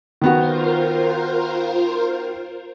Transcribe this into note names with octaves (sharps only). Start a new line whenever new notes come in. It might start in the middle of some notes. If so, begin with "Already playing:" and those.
D#3 B3 F4 F#4 A#4 C5